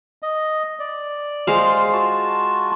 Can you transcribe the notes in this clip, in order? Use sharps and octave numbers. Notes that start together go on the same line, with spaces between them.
D#5
D5
G#3 C5 F5
F4 F#4 A5